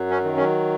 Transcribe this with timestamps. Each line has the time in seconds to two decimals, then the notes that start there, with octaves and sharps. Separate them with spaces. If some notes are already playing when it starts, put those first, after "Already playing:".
Already playing: F#2 F#3
0.10 C#4
0.24 D#3
0.37 C#4